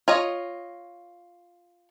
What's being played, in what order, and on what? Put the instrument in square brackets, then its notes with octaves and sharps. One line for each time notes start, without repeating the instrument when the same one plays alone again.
[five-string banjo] F4 C#5 D#5